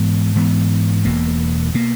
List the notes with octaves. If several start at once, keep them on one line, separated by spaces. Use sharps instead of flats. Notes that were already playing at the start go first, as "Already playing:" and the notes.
Already playing: G#2 E3 B3
G#2 E3 B3
E1 E2 B2 A#3
B2 A#3